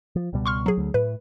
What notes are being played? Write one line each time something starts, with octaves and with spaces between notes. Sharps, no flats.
F3
C#2 B2 G3
C6 C#6 F6
F#3 G#4
D2
A2 B4